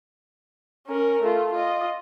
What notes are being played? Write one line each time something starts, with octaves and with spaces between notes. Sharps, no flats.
C#4 A#4
A3 F4
F4 D#5